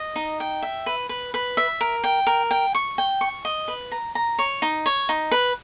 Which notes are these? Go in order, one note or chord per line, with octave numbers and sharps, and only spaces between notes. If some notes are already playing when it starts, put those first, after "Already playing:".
Already playing: D#5
D#4
G5
E5
B4
B4
B4
E5
A#4
G5
A#4
G5
C#6
G5
C#6
D#5
B4
A#5
A#5
C#5
D#4
C#5
D#4
B4